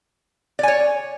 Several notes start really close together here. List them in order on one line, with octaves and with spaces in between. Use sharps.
D5 G#5 C#5